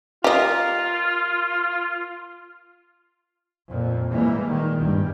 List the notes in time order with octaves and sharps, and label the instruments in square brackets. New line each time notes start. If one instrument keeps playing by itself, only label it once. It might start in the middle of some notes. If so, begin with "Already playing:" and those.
[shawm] F4 [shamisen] G4 D#5 [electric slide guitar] A#4 F5
[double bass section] F2 A#2
A#2 E3 G3 G#3 A#3
D#3
G#1 E2 G2 G3